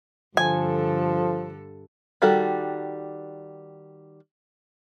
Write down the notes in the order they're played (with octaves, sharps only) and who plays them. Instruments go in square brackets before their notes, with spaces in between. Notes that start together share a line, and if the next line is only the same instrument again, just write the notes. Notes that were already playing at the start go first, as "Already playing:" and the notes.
[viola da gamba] G2 D3 A4 [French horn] F3 [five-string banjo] G#5
[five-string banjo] D#3 G3 F#4 G4 A4